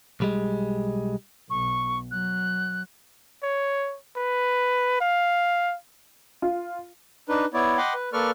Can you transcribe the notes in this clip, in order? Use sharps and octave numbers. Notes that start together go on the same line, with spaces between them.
B1 G3 G#3
B1 C#6
F#3 F#6
C#5
B4
F5
F4
D4 D#4 B4
B3 E4 C#5 D5
D#5 F#5 G5 B5 C6 D6
B4
A#3 A4 B4 D5 C#6 F6